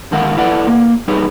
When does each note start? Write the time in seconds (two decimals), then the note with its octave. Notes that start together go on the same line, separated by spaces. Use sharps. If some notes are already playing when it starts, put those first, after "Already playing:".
0.12 D3 D#3 G#3 A#4 F5 F#5
0.37 E4 A4 B4 D5 F#5
0.67 A#3
1.08 G3 D#4 G#4 B4 C#5